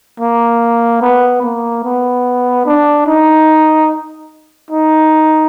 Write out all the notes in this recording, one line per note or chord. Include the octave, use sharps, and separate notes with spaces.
A#3
B3
A#3
B3
D4
D#4
D#4